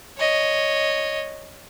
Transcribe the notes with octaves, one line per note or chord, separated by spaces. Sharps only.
C#5 D#5